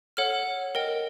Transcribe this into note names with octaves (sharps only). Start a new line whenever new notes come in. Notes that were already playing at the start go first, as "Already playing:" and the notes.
A4 C#5 F#5 F6
A#4 D#5 G5